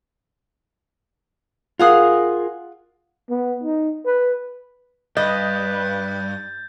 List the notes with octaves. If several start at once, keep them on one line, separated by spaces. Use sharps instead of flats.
F4 G#4 A#4 F5 F#5 D#6
B3
D#4
B4
G2 B4 D#5 G6 A6